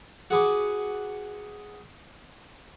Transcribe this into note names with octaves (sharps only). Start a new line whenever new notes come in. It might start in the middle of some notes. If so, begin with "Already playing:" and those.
F#4 G#4 B4 D6